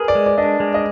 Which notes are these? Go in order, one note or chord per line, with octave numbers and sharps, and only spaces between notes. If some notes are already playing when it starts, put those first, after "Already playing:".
Already playing: G#4 A#4 B4
D5
G#3
D5
D4 D#5
G#3
D#5